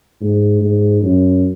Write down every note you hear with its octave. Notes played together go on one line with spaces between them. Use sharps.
G#2
G#2
F#2